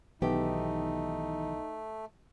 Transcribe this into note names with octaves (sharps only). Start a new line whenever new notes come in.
B1 D#3 E3 A3 B3 D#4 G4